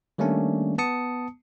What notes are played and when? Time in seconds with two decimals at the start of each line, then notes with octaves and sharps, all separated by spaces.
0.18 D#3 G3 A3 A#3 C#4 D4
0.78 B3 A5 D#6 C#7